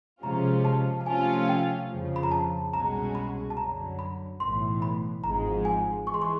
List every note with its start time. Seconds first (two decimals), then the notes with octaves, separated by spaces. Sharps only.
0.23 C3 F3 G#3 C#4 F4 A#5
0.65 A5
1.01 A5
1.06 C3 F3 A3 C#4 F4 G#5
1.49 G5
1.90 F2 C#3 F3
2.16 B5
2.23 A#5
2.31 A5
2.73 C2 B2 G#3 C#4 F#4 A#5
3.15 B5
3.50 A5
3.57 F#2 D3 F#3 A#5
3.99 B5
4.40 B1 A2 E3 C6
4.82 B5
5.24 G#1 G#2 F3 G#3 A#5
5.65 G#5
6.07 E3 G#3 C#6
6.14 C6
6.22 C#6